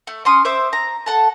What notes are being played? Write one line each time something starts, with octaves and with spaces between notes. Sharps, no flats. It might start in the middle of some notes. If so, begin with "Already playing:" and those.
A3
C#4 C6 D#6
C5 E5 D6
A#5
A4 F#5 A5